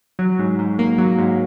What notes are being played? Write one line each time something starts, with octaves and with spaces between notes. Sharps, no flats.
F#3
G#2
G#2
A#3
F#3
G#2